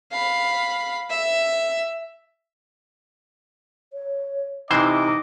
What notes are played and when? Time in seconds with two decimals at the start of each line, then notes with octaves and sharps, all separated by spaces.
0.12 F5 B5
1.10 E5
3.93 C#5
4.71 C3 E3 D#4 C5 D#5 D6